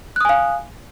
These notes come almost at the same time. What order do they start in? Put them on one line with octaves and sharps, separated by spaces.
F#6 D#6 G#5 F5